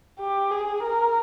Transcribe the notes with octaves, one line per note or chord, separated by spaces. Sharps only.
G4
G#4
A#4